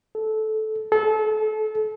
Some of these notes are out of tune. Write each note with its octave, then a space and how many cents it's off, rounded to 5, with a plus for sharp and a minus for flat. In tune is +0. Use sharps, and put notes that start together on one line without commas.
A4 -15
A4 -30